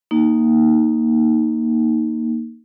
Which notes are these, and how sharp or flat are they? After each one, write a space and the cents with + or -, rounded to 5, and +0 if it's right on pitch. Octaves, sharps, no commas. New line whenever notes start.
A#3 +0 D#4 +0